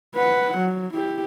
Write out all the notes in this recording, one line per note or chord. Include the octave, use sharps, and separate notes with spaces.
B4 F#5
F#3
E4 G4